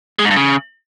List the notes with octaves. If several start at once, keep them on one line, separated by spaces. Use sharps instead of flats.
G#3
G#2
G2
C#3